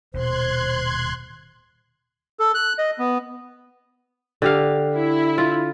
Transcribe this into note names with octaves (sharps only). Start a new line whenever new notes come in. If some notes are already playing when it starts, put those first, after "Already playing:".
D#1 B2 D#3 C5 C6 F#6 G#6
A4
F#6
D#5
B3
D3 G4 F5
E4
F4